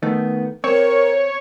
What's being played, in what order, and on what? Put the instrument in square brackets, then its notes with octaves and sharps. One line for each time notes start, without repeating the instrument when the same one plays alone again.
[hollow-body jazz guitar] D#3 A3 B3
[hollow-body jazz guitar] C4 [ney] A#4 [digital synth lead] C#5